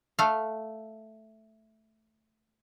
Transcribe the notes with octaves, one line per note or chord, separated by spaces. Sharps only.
A3 F5